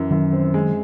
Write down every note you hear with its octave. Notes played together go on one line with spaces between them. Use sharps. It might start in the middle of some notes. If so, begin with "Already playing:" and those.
Already playing: F#2 E3
F#2 D#3 F#3
C4
G#3